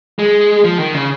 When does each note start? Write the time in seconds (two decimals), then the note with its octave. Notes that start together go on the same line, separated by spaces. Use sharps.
0.19 G#3
0.64 F3
0.79 D#3
0.94 C#3